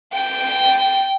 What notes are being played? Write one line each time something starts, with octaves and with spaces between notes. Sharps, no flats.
G5